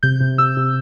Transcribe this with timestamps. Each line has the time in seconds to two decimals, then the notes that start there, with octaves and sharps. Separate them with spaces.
0.03 C3 G6
0.21 C3
0.38 C3 E6
0.57 C3